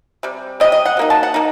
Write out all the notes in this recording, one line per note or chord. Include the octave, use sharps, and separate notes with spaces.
C3 G3
C3 G3 C4 D#5
D#5
F#5
F#3 A#3 D#4
A5
F#5
A#3 D#4